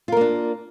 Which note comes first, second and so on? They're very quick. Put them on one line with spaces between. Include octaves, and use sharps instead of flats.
F4 A#4 A#3 D4